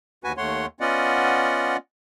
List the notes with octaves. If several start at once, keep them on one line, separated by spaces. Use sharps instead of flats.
D#2 F#4 B4 G#5
D#2 A3 C#5 F#5 C6
B3 C#4 F4 D5 D#5 F#5